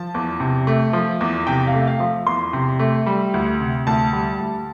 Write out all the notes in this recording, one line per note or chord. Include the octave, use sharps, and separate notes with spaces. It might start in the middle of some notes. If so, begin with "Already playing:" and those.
Already playing: F3 A5
E2
C3
A3
F3
E2
C3 G5
F5
A3
F5
F3
E2 C6
C3
A3
G3
D2
C3
D2 A5
G3
D2